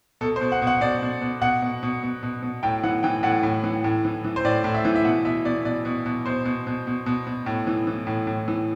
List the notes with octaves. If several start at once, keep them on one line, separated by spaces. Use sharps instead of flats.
B2 A4
C5
B2
F#5
B2
F#5
B2 D5
B2
B2
B2 F#5
B2
B2
B2
B2
B2
A2 G5
E3 F#5
E3 G5
A2 F#5
A2
E3
A2
E3
E3
C5
A2 D5
A2
E5
E3
E5
B2 F#5
B2 E5
B2 D5
B2 D5
B2
B2
B2 C5
B2
B2
B2
B2
B2
A2
E3
E3
A2
A2
E3